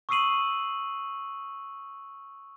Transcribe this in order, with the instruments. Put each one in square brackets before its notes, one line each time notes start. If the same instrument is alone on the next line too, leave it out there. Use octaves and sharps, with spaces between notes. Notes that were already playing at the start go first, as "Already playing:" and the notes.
[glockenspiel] C#6 D#6 E6 C7 D#7 F#7